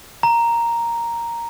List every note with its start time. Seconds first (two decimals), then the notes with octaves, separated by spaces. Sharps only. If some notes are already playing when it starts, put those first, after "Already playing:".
0.23 A#5